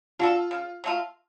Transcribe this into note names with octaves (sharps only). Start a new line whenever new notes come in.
D4 F4 F#4 A4
C#3
F#3 A3 F4